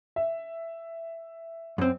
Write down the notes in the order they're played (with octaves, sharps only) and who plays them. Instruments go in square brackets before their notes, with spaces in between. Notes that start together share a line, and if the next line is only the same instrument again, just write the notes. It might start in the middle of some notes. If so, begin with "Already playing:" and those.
[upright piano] E5
[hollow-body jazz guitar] F#2 C4